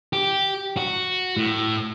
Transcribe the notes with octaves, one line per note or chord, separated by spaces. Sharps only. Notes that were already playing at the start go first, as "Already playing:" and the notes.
G4
F#4
A2